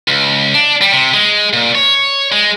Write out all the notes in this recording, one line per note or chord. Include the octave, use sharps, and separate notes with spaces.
C#2
D4
G3
C3
G#3
A#2
C#5
G#3